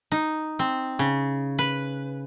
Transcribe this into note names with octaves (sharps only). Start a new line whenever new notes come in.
D#4
C4
C#3
B4